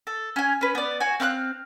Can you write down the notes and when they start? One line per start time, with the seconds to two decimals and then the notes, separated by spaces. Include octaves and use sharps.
0.07 A4
0.36 C#4 G#5
0.61 C#4 B4
0.75 B3 D5
1.00 F#4 C#5 G#5
1.20 C4 F5 B5 F#6